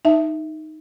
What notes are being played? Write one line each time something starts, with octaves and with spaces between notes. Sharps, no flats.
D#4 E5 A5